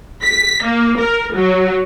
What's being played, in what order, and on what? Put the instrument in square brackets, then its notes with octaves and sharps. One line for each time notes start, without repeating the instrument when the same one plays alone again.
[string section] B6
A#3
A#4
F#3